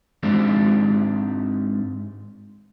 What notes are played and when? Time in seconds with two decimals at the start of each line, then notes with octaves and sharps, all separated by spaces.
0.23 G#2 G#3 C4 D4